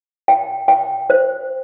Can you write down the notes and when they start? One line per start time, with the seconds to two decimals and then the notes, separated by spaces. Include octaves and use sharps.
0.28 G5
0.68 G5
1.10 C5